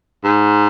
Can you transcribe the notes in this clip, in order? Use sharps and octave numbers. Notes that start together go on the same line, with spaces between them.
G#2